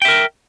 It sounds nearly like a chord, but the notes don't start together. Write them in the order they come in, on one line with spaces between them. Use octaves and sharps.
G5 E5 A#4